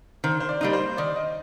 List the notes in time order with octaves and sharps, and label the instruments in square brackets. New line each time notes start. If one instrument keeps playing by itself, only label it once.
[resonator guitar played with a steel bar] D#3 [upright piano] C5
[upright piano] C5
D5
[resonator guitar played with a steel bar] G3 A#3 D#4
[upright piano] C5
[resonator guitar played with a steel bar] D#3 [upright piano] D5
[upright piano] D#5